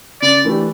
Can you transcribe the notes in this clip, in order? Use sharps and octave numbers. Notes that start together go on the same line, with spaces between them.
C#3 D5
E3 A3 D4 G4